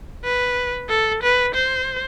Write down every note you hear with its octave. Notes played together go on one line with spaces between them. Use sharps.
B4
A4
B4
C5